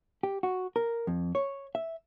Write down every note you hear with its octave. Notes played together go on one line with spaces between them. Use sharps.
G4
F#4
A#4
F2
C#5
E5